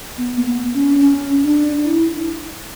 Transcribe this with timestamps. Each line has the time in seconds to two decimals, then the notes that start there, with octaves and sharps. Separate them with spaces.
0.18 B3
0.37 A#3
0.46 B3
0.74 C#4
1.01 C#4
1.43 D4
1.84 E4